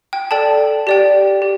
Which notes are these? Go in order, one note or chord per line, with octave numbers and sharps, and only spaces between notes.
G5
A4 D5 G5 A5
G4 D5 G5
G4